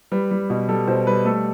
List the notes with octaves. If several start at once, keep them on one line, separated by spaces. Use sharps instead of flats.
G3 B4
G3
B2
G3 A4
B2 C5
G3 B4
A3 A4